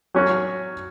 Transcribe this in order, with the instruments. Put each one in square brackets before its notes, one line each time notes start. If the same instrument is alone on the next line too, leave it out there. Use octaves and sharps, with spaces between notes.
[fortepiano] F#3 C#4 F#4